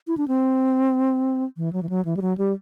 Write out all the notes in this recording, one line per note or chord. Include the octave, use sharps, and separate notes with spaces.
E4
D4
C4
E3
F#3
E3
F#3
E3
G3
F#3
G3